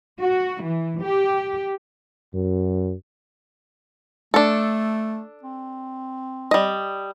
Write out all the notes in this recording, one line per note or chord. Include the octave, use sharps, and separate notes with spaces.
F#4
E3
G4
F#2
A3 D4 A4
C4
G3 D#5